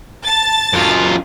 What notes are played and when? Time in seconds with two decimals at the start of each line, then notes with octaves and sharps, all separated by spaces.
0.24 A5 A6
0.73 F#2 F4